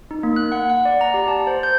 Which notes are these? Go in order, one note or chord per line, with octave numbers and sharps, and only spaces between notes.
D#4
A#3
F#6
F#5
F#5
D5
A#5
G4
A5
C5
G6